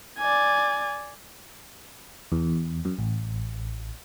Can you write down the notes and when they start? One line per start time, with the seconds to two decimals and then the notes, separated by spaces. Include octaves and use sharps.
0.18 D5 G#5
2.32 E2
2.85 F#2
2.98 A1